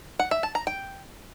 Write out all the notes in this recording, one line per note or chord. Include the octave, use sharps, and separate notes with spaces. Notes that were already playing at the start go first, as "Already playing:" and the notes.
F#5
E5
A5
A#5
G5